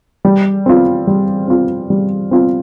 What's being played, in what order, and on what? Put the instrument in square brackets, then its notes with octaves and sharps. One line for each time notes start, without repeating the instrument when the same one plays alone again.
[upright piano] G3
C4 F4
G3
C4 F4
G3
C4 F4